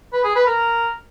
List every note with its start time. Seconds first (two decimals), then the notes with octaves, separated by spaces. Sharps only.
0.13 B4
0.24 G#4
0.35 B4
0.46 A#4